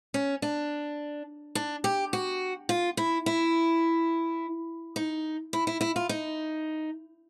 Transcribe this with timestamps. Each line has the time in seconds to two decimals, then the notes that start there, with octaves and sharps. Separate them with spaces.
0.14 C#4
0.42 D4
1.55 D4
1.84 G4
2.13 F#4
2.69 F4
2.97 E4
3.26 E4
4.96 D#4
5.53 E4
5.67 E4
5.81 E4
5.96 F4
6.09 D#4